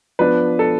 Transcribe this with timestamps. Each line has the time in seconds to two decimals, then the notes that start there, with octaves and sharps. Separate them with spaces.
0.19 F3 B3 D4 B4
0.59 A4